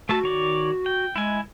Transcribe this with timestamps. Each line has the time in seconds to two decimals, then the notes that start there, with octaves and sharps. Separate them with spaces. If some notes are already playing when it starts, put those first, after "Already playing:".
0.09 A3 F#4 A4 A5
0.23 D#3 C#5 D5
0.86 G5
1.16 G#3 E4 G#5